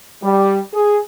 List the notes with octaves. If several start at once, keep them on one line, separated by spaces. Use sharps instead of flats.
G3
G#4